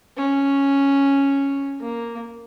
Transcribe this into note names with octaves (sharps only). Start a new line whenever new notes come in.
C#4
A#3